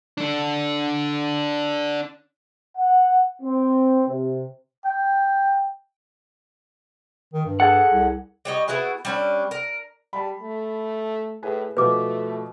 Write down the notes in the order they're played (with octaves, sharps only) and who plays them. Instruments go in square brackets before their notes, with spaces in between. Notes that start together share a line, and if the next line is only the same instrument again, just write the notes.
[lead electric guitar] D4 A4
[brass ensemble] F#5
C4
C3
[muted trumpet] G5
[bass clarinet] D#3
G2
[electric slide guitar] G#4 A4 F#5
[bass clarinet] C2
[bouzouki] G3 C#5 D#5
B3 E4 F#4 G#4
G3 C#4 D4
A#4
[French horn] G3 [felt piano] A5 B5
[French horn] A3
[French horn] A2 [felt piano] G#4 B4 G#5
[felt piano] B2 F3 F#4 [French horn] A3 [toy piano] B4 D6